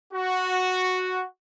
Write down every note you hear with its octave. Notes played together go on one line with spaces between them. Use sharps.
F#4